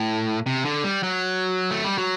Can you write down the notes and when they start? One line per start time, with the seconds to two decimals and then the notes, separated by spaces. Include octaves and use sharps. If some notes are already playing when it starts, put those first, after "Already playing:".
Already playing: A2
0.46 C3
0.65 D3
0.83 G3
1.03 F#3
1.71 A3
1.84 G3
1.98 F#3